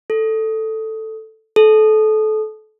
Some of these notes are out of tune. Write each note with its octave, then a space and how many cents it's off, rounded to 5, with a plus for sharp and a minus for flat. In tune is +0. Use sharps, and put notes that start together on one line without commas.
A4 +5
A4 -25